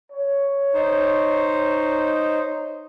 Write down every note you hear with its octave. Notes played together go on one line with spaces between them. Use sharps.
C#5
D#4 C5